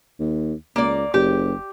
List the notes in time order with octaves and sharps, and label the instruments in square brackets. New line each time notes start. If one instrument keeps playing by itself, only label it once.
[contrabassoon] D#2
[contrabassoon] C#2 [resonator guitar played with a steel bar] A#3 D5
[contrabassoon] F#1 [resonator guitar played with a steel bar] G4